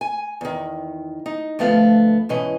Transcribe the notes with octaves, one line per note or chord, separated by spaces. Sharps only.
G#5
E2 D#3
D#4
D2 F3 A3 B3 F5
G#2 B2 E3 C#4 D#5